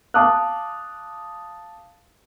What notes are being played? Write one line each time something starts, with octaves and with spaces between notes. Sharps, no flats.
F5 A5 D6 D#6 F6 F#6